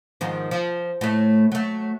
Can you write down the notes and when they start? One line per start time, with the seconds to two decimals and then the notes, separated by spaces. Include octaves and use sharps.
0.21 G#2 D#3 F3
0.51 F3
1.01 A2 A3
1.52 F#3 A3